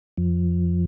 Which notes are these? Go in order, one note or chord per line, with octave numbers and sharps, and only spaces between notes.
F2 F3